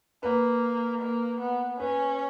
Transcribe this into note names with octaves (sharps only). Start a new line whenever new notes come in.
A#3 B4
A#3
B3
C#4 B4